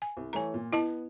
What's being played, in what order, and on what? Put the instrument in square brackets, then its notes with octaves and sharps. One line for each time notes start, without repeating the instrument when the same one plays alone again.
[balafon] G#5
[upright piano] C2
[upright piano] E3 A3 C#5 [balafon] G#5 A#5
[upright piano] A#2
[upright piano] B3 [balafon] E4 D#5 A5